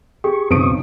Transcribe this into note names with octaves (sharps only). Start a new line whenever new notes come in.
G4 G#4 C#6
B1 F#2 C#3 B3 C4 C#6 D#6 D7